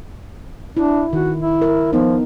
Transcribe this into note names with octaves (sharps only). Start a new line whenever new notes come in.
D4 E4
D#3 F#4
E4
A#4
F3 B3 D#4